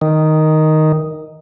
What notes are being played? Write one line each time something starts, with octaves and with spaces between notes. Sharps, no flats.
D#3